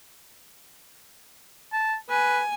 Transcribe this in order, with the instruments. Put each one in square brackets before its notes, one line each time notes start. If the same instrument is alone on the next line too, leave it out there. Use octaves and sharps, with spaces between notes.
[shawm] A5
[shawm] B4 [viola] G#5